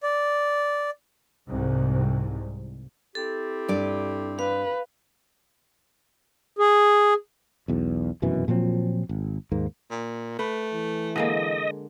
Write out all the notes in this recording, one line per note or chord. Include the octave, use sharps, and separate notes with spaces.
D5
C2 G#2
C4 E4 G4 A4
G2 D5
B4 F5
G#4
B1 E2
F1 F#2 B2 E3
A#2 F3 F#3 C4
G#1
D#2 G#2 A#3
A#2
A3 B4
E3
D3 G#3 A#3 D#5